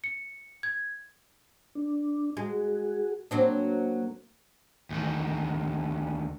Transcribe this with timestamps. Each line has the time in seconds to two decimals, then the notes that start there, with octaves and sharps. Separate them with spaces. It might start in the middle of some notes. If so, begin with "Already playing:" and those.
0.04 C#7
0.63 G#6
1.75 D4
2.37 G#3 F#4 G#4
3.31 F#3 A#3 C4 D4
4.90 D2 D#3